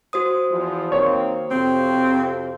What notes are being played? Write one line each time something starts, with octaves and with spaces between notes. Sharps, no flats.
F#4 C5 D#6
E2 E3 F3
D#3 A#3 C4 C#5
F2 C3 C4